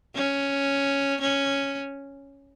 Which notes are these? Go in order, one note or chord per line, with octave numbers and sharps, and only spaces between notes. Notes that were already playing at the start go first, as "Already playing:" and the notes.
C#4
C#4